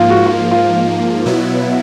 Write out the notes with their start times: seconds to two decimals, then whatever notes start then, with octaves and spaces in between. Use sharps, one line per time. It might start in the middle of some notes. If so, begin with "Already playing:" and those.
Already playing: G#2 F3 A#3 F4
0.10 F#4
0.27 F4
0.51 F4
1.26 B2 F#3 B3 E4